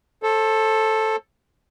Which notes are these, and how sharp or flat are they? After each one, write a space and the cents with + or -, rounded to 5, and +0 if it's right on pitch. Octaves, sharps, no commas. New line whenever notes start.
A4 +0 C5 +35